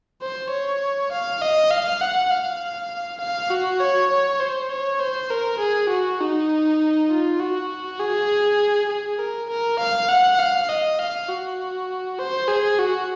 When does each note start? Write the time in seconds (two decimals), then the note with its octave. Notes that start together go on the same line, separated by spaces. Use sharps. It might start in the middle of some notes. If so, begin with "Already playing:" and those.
0.22 C5
0.51 C#5
1.12 F5
1.42 D#5
1.71 F5
2.01 F#5
2.31 F5
3.20 F5
3.50 F#4
3.80 C#5
4.11 C#5
4.40 C5
4.71 C#5
5.00 C5
5.30 A#4
5.59 G#4
5.89 F#4
6.20 D#4
7.10 F4
7.40 F#4
7.99 G#4
8.89 G#4
9.19 A#4
9.49 A#4
9.79 F5
10.09 F#5
10.38 F5
10.69 D#5
10.99 F5
11.29 F#4
12.19 C5
12.48 G#4
12.79 F#4